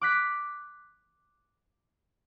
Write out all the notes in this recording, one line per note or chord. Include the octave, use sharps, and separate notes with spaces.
D6 F#6 B6